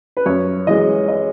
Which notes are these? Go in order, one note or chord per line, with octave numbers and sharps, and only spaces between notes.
B4
F#2 C#5
E3 G#3 D#5
D#5